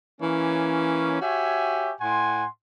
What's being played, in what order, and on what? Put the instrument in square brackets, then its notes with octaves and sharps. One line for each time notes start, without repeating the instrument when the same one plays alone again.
[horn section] E3 A#3 C#4
F#4 G4 C#5 E5 G#5
A2 F#5 G#5 C6